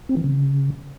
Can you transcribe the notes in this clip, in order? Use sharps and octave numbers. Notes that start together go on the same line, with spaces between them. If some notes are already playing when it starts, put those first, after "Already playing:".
C4
E3
C#3